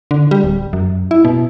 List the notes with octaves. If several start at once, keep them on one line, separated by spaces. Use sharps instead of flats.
D3
G3
D1
F#2
E4
B2